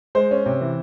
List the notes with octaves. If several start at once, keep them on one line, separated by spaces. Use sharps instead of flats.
G#3 C5
C#4
C3
E3